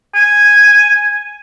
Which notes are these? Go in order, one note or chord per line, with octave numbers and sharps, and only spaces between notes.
G#5